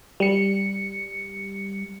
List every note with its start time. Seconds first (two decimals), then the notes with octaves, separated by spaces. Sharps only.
0.20 G3 C#7